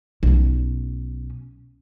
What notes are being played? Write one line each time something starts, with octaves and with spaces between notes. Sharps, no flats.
B1 C#4